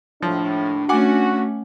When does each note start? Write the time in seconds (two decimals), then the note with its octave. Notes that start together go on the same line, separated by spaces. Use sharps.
0.23 D#2 A2 F3 D4
0.89 A3 C#4 F#4 F#5 G#5 D6